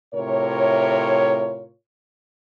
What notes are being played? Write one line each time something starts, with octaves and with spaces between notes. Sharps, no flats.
A2 C3 F4 A#4 C#5